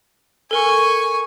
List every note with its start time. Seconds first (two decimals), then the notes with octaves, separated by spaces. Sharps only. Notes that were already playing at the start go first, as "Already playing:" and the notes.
0.51 A4 A#4 G#5 C#6